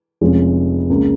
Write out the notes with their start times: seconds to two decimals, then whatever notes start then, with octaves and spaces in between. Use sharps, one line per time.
0.21 F1 F2 F3 G#3 C#4
0.90 C#2 C#3 A#3